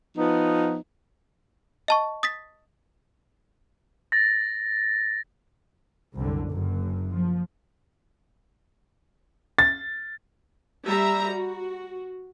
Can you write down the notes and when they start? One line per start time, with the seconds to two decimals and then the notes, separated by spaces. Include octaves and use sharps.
0.17 F3 B3 D#4
1.88 D#5 A5 C#6
2.23 D#6 A6 B6
4.12 A6 A#6
6.16 C2 F#2 D3
6.50 F#1 F#2
7.12 F3
9.59 A6
10.85 G3 E5 A#5
11.30 F#4